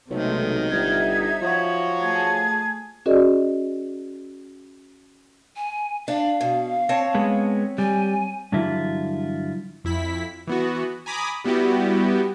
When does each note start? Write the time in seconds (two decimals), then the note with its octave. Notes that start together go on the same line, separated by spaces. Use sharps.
0.11 B1 C3 D#3 G#3 A3
0.71 G1 D#4 E5 G#6
1.42 F3 F#4 C#5
2.01 A3 G#4 A5 G#6
3.06 C#4 F#4 G#4 A#4 D5 D#5
5.56 G#5
6.08 D4 F5
6.41 B2
6.89 C4 C#5 A5
7.15 G#3 B3
7.78 G3 G#5
8.52 G2 D3 E3 F#3 E4 F4
9.84 F2 E4 B6
10.47 E3 B3 F#4
11.06 G#5 A#5 B5 D6 D#6
11.44 G3 B3 E4 F#4 G4